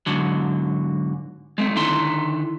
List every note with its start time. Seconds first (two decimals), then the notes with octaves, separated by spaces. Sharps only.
0.06 G#2 D3 F#3
1.58 G#3 A3 C4
1.76 D3 D#3 E4 C6